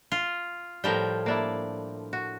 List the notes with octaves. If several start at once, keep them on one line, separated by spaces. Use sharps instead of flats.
F4
A2 F3 G3 A#4 G5
A#3 D4 E4
F#4